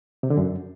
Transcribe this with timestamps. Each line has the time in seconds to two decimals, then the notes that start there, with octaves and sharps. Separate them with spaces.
0.23 C3
0.30 D3
0.37 F#2